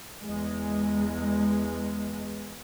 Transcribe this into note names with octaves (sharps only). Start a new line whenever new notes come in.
E2 G#3